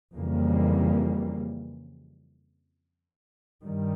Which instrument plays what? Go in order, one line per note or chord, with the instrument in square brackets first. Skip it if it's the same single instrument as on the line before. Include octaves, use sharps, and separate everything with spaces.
[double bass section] F2 C#3 E3 G3 A#3
G2 D#3 G3